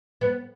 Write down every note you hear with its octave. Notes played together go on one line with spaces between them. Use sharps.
B3